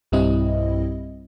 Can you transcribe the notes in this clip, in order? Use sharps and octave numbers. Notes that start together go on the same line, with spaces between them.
B1 G2 G3 C4 E4 D#5